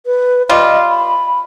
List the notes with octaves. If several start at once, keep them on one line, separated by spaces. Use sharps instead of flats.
B4
G3 F4 D#5
B5